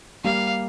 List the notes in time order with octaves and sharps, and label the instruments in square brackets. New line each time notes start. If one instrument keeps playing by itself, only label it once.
[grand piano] G3 A#3 [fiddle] F5